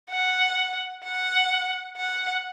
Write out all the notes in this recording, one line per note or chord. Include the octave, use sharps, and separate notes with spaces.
F#5
F#5
F#5